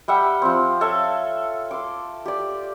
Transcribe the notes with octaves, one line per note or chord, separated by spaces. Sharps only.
G3 E5 F#5 G5
F3 C4
A4 C#5 E5 F5
C6 D6
G4 D5